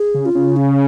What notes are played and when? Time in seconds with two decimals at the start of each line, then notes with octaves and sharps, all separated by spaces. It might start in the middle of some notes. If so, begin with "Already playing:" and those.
Already playing: G#4
0.14 C#3
0.26 F4
0.35 C#3
0.57 C#4